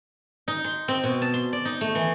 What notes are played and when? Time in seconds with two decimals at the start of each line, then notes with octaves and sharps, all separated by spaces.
0.48 D#4
0.64 C6
0.88 C4
1.04 B2
1.22 A5
1.34 C6
1.53 D5
1.65 D#4
1.81 A3
1.95 E3